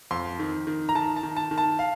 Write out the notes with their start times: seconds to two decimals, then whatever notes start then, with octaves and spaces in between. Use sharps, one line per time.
0.11 F2 C6
0.39 D#3
0.67 D#3
0.89 A#5
0.95 D#3 A5
1.16 A5
1.23 D#3
1.37 A5
1.51 D#3
1.58 A5
1.79 F5